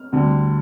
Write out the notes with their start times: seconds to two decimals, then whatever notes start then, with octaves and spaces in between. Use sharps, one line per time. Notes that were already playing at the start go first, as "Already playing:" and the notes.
Already playing: F6
0.12 D2 D3 G3